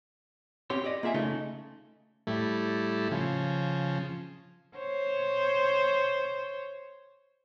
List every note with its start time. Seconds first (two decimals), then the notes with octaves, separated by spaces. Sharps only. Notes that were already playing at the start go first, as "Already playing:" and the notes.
0.70 C4 C#4 G4 C#5 F5 C6
0.84 G4 D5 D#5
1.03 A#3 F4 G#4 E5 F#5 G#5
1.14 C#3 A3 C#4 D#4
2.27 A2 G3 A3 E4
3.11 C#3 F3
4.77 C5 C#5